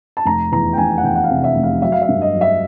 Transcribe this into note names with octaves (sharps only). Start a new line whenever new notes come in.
A5
F1 A#5
E2 A#5
G5
F1 G#5
F#5
E2 G5
F#5
F5
C3
E5
F1
F5
F#3 E5
F5
E5
G2
D#5
F#3
E5